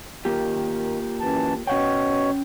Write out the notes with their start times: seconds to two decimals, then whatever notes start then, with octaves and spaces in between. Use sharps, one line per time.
0.25 D#3 A#3 F4 G4
1.20 F#2 E3 A5
1.67 B2 C#4 C#5 F#5 G5